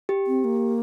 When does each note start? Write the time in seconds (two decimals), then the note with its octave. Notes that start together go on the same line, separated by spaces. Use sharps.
0.09 G4
0.27 C4
0.44 A#3